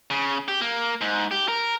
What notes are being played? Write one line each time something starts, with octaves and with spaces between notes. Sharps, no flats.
C#3
G4
A#3
G#2
G4
A#4